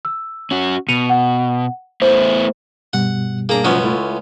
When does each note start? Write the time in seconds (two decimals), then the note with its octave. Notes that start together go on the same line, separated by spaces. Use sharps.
0.05 E6
0.51 C#4 F#4
0.89 B2 C#7 D#7 F7
1.10 F#5
2.02 A3 B3 E4 C5
2.93 G2 B2 G3 F#5
3.49 A#3 D4 D#4 G#4 A#5
3.64 C#2 F#2 F3 B3 C#4
3.83 A3 E4 F4